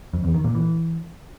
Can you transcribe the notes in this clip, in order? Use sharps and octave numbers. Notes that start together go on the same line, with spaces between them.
F2
E2
D#3
A#2
E3